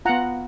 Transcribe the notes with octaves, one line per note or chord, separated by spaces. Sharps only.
B3 F4 F#5 A#5